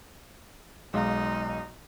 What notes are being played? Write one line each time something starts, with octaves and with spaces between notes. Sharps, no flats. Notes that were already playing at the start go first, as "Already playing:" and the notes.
B1 G#3 D#4 F5